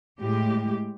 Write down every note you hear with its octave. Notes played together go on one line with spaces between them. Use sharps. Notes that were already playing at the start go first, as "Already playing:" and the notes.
A2 G#3 G4